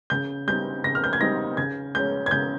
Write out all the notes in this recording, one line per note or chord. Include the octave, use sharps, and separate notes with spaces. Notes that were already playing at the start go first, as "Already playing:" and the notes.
C#3 G6
G3 C4 D#4 G6
C#3 A#6
F6
G6
G#6
G3 C4 D#4 A#6
C#3 G#6
G#3 C#4 G6
G#6
C#3 G6